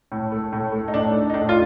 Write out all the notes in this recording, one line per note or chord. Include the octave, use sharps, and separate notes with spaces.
A2
A3
A2
A3
D#4
A2 D4
A3
D#4
A2 D4
F4